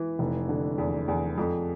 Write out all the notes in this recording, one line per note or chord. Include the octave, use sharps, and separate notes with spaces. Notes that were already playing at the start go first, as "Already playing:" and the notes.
Already playing: E3
F1
D3
E2
E2
F2